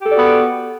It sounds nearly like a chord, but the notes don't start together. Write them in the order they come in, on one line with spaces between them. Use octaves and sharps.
G4 A4 D5 F#4 B3